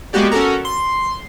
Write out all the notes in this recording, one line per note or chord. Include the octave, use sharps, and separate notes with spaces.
G#3 A#3 B3 F#4 G4 D5
C#4 F#4 A4 A#4
C6